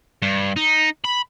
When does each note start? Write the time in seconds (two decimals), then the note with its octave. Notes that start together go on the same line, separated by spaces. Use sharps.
0.22 G2
0.56 D#4
1.04 B5